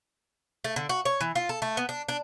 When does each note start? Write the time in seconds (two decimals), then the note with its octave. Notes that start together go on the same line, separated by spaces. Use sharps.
0.64 A3
0.76 D3
0.89 F#4
1.05 C#5
1.21 E3
1.35 F4
1.49 A4
1.62 A3
1.77 B3
1.89 D4
2.08 D4